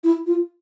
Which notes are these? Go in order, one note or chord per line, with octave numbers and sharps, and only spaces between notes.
E4
F4